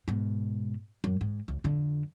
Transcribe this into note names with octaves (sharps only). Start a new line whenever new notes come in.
G#2 B2
F#2
G#2
C#2
F2 D3